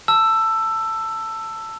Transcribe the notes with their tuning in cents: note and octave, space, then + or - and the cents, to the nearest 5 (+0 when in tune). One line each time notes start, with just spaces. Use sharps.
A5 +15 E6 +15